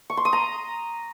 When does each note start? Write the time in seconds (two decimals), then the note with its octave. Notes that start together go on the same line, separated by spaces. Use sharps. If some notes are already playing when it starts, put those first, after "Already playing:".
0.10 C#6
0.17 C6
0.25 D#6
0.33 A#5